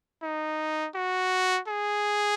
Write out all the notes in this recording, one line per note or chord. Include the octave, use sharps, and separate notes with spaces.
D#4
F#4
G#4